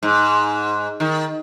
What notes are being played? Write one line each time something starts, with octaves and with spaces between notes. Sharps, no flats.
G#2
D#3